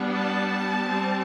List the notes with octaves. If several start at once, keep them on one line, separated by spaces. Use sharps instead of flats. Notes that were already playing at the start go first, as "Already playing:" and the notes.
Already playing: G3 B3 D4
A5
G3 C4